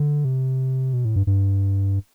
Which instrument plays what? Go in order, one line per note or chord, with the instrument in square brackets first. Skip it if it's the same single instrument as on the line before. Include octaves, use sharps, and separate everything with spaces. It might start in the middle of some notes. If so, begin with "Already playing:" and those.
Already playing: [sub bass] D3
C3
B2
A2
G2
G2